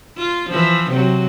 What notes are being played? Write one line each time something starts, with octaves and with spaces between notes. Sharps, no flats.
F4
E3 F3
C3 F#3